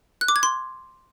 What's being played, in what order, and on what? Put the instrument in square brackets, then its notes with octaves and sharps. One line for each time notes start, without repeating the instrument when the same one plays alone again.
[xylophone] F#6
D6
G#6
C6